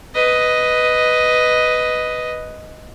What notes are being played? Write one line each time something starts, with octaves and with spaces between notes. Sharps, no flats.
B4 D#5